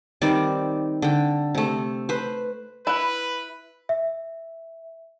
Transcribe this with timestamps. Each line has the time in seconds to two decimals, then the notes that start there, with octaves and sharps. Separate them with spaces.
0.22 D#3 G3 C4 D5
1.02 D3 G5
1.55 C3 A3
2.09 B4 C5
2.87 E4 B4 F#5
3.89 E5